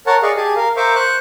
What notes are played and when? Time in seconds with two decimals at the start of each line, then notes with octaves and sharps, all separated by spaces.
0.07 A#4 C#5 F#5 A5
0.22 G#4 D5 D#5 F5 C#6
0.37 G4 G#4 G#5 A5
0.56 A#4 F5
0.77 A#4 C5 E5 F5 C#6 D6
0.95 C5 C#6 F#6